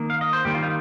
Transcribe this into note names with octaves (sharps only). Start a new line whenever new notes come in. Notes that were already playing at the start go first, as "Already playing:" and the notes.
Already playing: D#3 A#3
F5
D#5
C5
D#3 G3 A#3 G4
F4
D#4